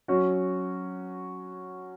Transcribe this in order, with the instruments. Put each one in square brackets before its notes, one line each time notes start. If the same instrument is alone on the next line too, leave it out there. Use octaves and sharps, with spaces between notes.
[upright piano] F#3 C#4 F#4